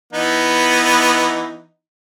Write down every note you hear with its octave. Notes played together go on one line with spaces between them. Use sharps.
E3 B3 D#4